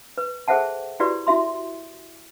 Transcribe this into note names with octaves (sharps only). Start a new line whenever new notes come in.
B4
G#4 A4 C5 E5 F#5 A5
E4 F#4 G4 B4 D5
E4 F#4 E5 C6